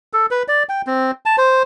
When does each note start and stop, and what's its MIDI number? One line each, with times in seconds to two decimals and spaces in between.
0.13 0.26 69
0.31 0.43 71
0.48 0.63 74
0.69 0.82 79
0.87 1.11 60
1.26 1.36 81
1.38 1.63 72